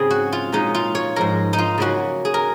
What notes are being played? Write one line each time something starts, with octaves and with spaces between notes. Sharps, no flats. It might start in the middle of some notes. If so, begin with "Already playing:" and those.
Already playing: G#2 C#3 C4 G#4
F#4
F4
A#2 G#3 C#4 D#4
F4
C#5
G#2 F3 G#3 A#4
D#4
F4
C#3 F#3 A#3 C#4 F#4
G#4
A#4